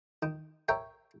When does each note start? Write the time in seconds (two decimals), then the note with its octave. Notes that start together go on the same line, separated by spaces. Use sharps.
0.23 D#3
0.68 A#4 C#5 E5 G5